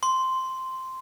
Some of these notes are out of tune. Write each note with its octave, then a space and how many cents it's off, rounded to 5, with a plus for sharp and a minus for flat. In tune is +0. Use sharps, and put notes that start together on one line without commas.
C6 -5